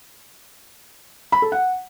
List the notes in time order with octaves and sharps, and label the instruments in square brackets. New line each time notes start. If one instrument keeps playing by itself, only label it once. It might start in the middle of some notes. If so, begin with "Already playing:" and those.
[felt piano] B5
A4
F#5